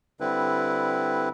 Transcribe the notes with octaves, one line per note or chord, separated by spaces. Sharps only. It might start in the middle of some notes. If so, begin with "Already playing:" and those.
D3 G3 C4 E4 B4